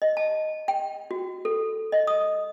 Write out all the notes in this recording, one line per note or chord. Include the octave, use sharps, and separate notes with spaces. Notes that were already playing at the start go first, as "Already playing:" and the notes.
D#5
A5
G5
F#4
A4
D#5
D#6